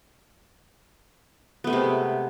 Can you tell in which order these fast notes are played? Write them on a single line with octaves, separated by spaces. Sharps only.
B3 A3 G#3 C3